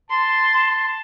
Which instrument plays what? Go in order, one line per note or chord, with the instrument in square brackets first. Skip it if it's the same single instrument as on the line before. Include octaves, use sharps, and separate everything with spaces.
[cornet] A5 [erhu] C6